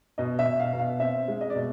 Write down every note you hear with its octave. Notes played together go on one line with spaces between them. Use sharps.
B2 D#5
E5
B2
F5
B2
F5
C4 E5
G#3
D#5
D5
B2